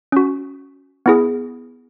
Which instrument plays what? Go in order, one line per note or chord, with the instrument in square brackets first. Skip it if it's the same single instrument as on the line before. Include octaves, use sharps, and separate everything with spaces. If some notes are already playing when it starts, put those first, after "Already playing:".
[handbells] C#4 F#4
B3 E4 G#4